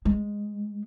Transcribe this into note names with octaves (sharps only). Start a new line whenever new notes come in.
G#3